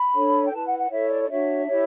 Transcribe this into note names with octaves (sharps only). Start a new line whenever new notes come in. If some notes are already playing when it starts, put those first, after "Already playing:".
Already playing: B5
D4 A4 C#5
G5
E4 B4 A5
F#5
F#5
E4 A4 C#5 E5
D5
D5
D4 F#4 C#5 E5
E4 G4 C#5